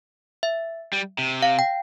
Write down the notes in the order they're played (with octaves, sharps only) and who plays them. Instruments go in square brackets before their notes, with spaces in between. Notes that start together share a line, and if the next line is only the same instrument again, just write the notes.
[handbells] E5
[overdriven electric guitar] G3
C3
[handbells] F5
G5